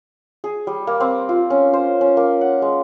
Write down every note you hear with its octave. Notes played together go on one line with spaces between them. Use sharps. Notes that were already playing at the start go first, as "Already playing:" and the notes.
G#4
G3
A#3
C4
F4
C#4
C5
C#4
A#3
F#5
G#3